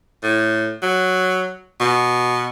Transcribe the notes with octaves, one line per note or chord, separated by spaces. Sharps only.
A2
F#3
B2